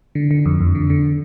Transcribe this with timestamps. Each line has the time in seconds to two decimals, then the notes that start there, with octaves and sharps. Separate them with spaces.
0.15 D3
0.31 D3
0.46 F2
0.61 F2
0.75 D3
0.90 D3